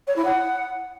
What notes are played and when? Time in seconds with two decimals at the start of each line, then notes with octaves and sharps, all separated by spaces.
0.08 C#5
0.16 E4
0.25 F#5